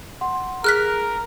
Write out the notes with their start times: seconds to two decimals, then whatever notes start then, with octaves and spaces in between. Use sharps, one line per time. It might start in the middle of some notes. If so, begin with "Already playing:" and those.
0.21 F#5 C6
0.64 G#4 A#4 F6 F#6 B6